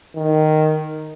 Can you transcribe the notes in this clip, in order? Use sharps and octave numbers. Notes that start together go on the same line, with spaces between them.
D#3